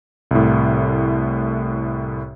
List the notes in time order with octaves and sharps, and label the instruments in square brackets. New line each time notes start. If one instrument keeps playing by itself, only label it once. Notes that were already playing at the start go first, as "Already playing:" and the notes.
[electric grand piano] C2 A2